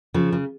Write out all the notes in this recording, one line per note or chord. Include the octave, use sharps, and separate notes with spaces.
C#3 F3
C#3